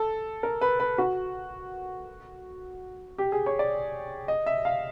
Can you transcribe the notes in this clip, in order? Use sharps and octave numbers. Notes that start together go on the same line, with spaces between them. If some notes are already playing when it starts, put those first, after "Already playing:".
Already playing: A4
A#4
B4
B4
F#4
G4
G#4
C#5
D5
D#5
E5
F5